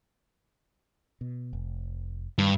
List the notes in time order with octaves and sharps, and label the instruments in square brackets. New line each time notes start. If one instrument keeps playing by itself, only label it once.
[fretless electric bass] B2
F1
[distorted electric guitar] G2 [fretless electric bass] D#3